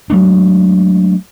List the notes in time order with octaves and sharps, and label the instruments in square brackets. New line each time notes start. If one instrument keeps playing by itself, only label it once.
[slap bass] F#3 G#3 A3 D4